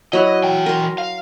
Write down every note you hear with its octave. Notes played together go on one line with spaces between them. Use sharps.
F#3 E4 F#4 D#5
E3 G5
A#4 C6
F5